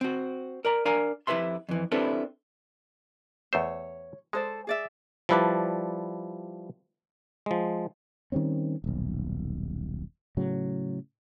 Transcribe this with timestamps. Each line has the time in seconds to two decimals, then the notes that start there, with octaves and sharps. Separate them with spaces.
0.01 C4 F#4
0.65 A#4 D5 A#5
0.85 D4 A#4 F5 G#5 A#5
1.27 F2 E4 G4 B4 E5 C6
1.69 F2 E3
1.92 C4 D4 E4 G4 A4 B4
3.53 E2 A3 C5 C#5
4.33 G#3 A4 C5 D5
4.67 G#4 D5 E5
5.29 F3 G3 E4 B4 D5 A5
7.46 F3 G#3
8.32 D#3 G3 C4 C#4
8.84 D#1 B1
10.37 A2 C#3 F#3